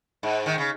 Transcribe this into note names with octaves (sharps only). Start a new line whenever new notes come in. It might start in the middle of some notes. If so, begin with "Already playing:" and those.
G#2
D#3
C#3